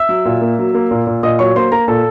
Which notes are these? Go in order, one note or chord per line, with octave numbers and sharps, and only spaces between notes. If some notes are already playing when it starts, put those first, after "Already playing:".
Already playing: E5 E6
F#3
A#2
A#3
F#3
A#3
A#2
A#2
A#2 D#5 D#6
F#3 C#5 C#6
A#3 C5 C6
A#3 A#4 A#5
A#2 A4 A5